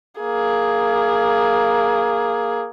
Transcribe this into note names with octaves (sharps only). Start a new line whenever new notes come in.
A#3 G#4